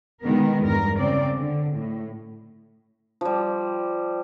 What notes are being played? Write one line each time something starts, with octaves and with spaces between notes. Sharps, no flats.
B2 D#3 G#3 B3 A#4
E2 G2 A#4
C#3 C4 D5
D3
A2
F3 G3